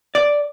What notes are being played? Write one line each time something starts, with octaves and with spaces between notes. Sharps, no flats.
D5